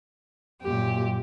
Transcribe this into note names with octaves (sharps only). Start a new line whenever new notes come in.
F#2 A#2 G4